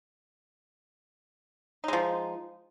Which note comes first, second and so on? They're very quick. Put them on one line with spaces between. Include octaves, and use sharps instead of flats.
D#4 G#3 F3